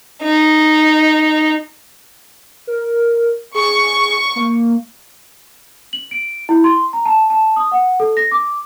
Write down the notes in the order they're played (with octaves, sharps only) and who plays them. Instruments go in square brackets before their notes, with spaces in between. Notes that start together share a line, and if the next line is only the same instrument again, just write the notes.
[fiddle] D#4
[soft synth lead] A#4
[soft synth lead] G#4 [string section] C#6
[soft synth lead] A#3
[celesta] F#7
D7
E4
C6
A#5
A5
A5
D#6
F#5
A4
A#6
D6